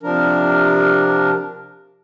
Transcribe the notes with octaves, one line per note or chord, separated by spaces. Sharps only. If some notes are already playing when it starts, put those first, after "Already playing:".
C3 F3 D4 A#4